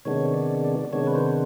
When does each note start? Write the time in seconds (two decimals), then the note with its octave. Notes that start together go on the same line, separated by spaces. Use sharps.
0.05 C3 D#3 G#3 B3 D4 C#5
0.34 D5
0.64 D5
0.93 C3 D#3 G#3 B3 D4 C#5
1.07 B4
1.15 C5